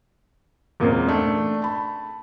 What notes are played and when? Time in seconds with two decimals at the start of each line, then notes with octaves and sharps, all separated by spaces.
0.80 E2 A#2 G#3 A#3 C4 C#4
1.08 A3 D4
1.62 A5 B5